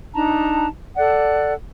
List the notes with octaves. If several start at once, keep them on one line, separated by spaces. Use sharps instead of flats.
D4 D#4 A5 A#5
A4 D5 F#5 F#6